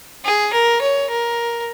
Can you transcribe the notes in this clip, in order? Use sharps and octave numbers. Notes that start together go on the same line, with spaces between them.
G#4
A#4
C#5
A#4